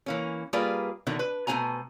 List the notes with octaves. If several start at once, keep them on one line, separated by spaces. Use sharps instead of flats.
E3 A#3 C#4
G3 A#3 F4 G#4 B4 D5
B2 D3 D#3 E5
B4
B2 A3 E4 C5 G#5 A#5